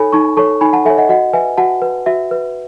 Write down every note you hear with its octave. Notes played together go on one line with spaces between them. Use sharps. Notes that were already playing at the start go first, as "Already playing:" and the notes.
Already playing: D#4 A4 C#5 G#5 B5
D#4 A5 C#6
A4 C#5 A5 C#6
D#4 G#5 B5
F#5 A5
A4 C#5 E5 G#5
D#5 F#5
F#4 D#5 F#5
B4 E5 G#5
F#4 F#5 A5
B4
F#4 E5
B4